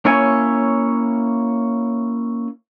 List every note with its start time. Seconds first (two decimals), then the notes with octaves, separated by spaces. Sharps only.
0.05 A#3 C#4 E4 C#5 G#5